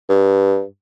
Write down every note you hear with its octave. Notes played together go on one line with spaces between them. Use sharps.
G2